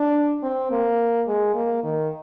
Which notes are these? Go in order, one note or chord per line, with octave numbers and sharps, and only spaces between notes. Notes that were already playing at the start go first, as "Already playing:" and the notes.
Already playing: D4
C4
A#3
G#3
A#3
D#3